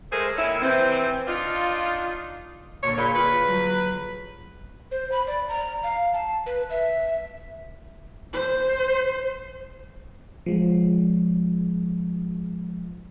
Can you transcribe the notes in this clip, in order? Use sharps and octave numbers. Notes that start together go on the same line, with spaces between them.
G#3 A3 G#4 A#4 C5
D#2 D#3 C#4 E4
C3 E3 C4
D4 D#4 F4
A#2 D3 C#5
A#2 G#4 B5 C6
F4 B4
F#3
C5
B5
D5
A#5
F5
A5
B4
E5
C5
F3 G#3